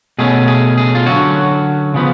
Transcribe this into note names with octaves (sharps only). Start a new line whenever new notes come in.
B2 A3 C#4 G#4
G#4
G#4
F4
D3 F#3 C#4 F#4
C#3 F3 B3